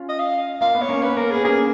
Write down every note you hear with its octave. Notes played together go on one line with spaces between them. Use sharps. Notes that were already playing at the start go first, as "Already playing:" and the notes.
Already playing: C#4 F4
D#5
F5
A#3 F5
B3
C#5
A#3 C#4
B3 B4
A#3 A#4
B3 G#4
A#3 C#4 G#4